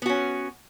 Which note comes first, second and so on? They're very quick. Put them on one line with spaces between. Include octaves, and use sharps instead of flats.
B3 F#4 C#4